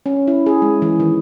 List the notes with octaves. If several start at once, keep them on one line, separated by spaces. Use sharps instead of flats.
C#4
E4
G#4
G#3
E3
D#3